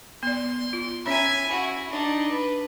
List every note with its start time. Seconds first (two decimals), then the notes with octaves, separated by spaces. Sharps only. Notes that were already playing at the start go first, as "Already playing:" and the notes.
0.23 B3 D5 C6
0.73 F4
1.06 C#4 C#5 E5 G#5 B5
1.48 E4 F#4
1.89 D4 D#4
2.30 B4